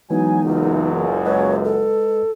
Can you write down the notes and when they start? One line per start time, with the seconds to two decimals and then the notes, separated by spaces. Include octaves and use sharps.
0.10 E3 F#3 G#3 B3 D#4 G#5
0.42 F#1 C#2 F#2
1.26 G#3 B4 C#5 D#5
1.65 A4